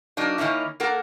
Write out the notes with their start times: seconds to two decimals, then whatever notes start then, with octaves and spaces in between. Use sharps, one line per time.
0.17 F#3 A#3 D4 D#4
0.38 D#3 A#3 C#4 D#4 E4
0.80 A#3 A4 A#4 F#5